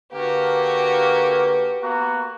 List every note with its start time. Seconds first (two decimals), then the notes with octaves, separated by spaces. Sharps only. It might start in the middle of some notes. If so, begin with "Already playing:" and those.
0.13 D3 A#3 F#4 G4 B4
1.82 A#3 B3 F#4